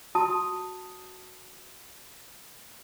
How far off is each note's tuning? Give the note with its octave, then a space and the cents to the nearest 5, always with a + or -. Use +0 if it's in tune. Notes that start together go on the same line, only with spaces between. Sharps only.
F#4 +0 A5 +10 D#6 +0